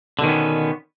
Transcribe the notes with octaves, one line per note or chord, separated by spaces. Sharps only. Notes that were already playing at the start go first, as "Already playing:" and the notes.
B2 D3 D#3 B3 C#4